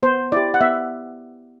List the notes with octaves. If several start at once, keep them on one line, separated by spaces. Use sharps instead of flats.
B3 C5
E4 G4 D5
F#5
B3 E5